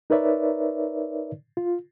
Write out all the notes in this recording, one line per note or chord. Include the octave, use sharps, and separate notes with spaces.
D#4 A#4 B4 C#5 D5 E5
F4